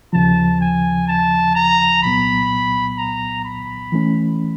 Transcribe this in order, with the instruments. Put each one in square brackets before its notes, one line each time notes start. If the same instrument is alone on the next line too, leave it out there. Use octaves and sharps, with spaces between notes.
[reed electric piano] D#2 C#3 F3 [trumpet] A5
[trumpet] G#5
A5
A#5
[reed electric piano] C2 A#2 F#3 B3 [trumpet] B5
[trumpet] A#5
B5
[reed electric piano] E3 A3 C#4